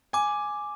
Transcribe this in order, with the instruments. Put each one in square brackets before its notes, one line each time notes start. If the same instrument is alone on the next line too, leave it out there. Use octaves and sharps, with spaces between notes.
[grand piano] G#5 [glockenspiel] D6